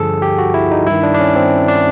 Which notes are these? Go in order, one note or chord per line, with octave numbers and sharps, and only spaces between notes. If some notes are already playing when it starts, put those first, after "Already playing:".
Already playing: G2 D3 F3 G#4 A4
G4
F#4
E4
D#4
G2 D#3 E4
D4
D4
C#4
C4
D4